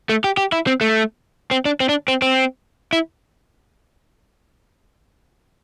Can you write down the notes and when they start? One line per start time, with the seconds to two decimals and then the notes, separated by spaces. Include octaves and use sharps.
0.09 A3
0.24 G4
0.37 G4
0.52 E4
0.67 C4
0.81 A3
1.51 C4
1.65 D4
1.80 C4
1.89 D4
2.08 C4
2.22 C4
2.93 E4